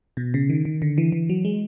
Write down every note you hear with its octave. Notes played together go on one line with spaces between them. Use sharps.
B2
C#3
D#3
D#3
D3
E3
E3
F#3
G#3